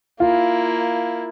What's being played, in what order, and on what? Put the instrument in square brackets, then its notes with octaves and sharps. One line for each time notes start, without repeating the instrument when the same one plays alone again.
[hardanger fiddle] A#3 E4 [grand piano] F4